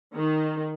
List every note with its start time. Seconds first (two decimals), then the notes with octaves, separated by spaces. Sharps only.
0.14 D#3